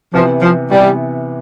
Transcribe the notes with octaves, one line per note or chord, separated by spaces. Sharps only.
C3 E3 F3 B3
F3
C3 E3 G3 B3